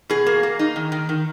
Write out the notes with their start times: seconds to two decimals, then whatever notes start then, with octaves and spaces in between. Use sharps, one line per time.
0.09 B2 G#4
0.26 A#3
0.43 A#3
0.59 D#4
0.76 D#3
0.92 D#3
1.09 D#3